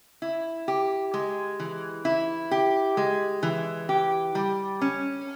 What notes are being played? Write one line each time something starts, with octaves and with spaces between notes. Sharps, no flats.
E4
G4
G#3
E3
E4
G4
G#3
E3
G4
G3
C#4